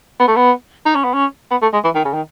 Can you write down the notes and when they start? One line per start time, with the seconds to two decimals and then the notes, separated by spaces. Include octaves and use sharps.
0.20 B3
0.28 A3
0.36 B3
0.86 D#4
0.95 C#4
1.04 B3
1.14 C#4
1.51 B3
1.62 A3
1.73 G#3
1.84 E3
1.95 D#3
2.05 C#3
2.13 D#3